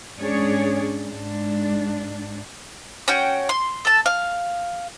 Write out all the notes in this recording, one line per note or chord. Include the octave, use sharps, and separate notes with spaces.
G#2 C#4 D4 G#4 C#5 D5
G#2 D4
C#4 F#4 G5
C6
A4 A5
F5